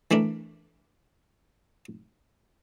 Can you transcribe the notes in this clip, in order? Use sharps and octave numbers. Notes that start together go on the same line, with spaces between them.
E3 A3 D4 A#4